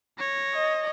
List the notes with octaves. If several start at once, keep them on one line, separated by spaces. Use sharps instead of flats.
C#5 A#6
D#5